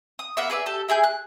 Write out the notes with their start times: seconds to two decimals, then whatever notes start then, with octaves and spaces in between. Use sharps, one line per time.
0.19 D#6
0.37 A#3 B3 E5
0.50 G#4 B4 D5 E5
0.66 G4 A4
0.89 E4 G#4 G#5 G6
1.04 F#6